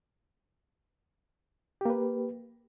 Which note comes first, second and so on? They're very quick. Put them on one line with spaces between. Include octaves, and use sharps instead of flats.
G4 A#3 B4